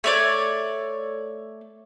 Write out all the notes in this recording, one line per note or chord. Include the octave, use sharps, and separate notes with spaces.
A3 C#5 D5